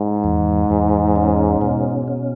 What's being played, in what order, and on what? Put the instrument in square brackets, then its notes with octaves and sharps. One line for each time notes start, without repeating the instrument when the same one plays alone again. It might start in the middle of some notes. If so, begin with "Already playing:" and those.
Already playing: [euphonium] G#2
[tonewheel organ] E2
E2
C#4
B2
C#4